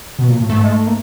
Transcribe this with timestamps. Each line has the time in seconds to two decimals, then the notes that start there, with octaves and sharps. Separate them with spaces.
0.19 B2
0.28 A#2
0.40 A2
0.50 G#2 A3
0.64 G#3
0.72 A3
0.87 A#3